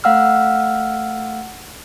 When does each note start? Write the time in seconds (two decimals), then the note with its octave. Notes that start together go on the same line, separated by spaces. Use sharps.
0.04 A3 F5 F#5 E6 F6